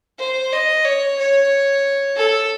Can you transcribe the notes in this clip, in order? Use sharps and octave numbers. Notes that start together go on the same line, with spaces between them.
C5
D#5
C#5
C#5
A4